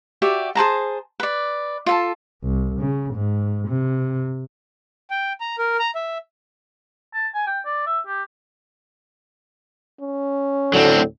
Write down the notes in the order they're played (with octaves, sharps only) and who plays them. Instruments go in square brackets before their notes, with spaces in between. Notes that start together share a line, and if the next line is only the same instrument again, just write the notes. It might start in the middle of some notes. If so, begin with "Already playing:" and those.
[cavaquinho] F#4 G4 D5 E5
G#4 C5 A5 A#5
B4 D5
F4 A4 A5
[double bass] C2
C#3
G#2
C3
[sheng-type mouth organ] G5
A#5
A#4
A#5
E5
[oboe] A5
G#5
G5
D5
E5
G4
[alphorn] C#4
[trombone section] D2 A2 D3 [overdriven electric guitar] F#3 C4